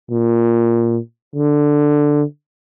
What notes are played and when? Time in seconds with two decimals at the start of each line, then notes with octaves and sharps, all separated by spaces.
0.11 A#2
1.36 D3